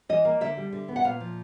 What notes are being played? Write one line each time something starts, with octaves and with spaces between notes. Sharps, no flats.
E3 D#5
A#3
D3 E5
G3
D3
B3
F#5
A#2 F5
F3